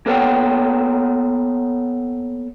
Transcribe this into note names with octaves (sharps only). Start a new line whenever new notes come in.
A#3 B3 A4 C#5 F#5 G5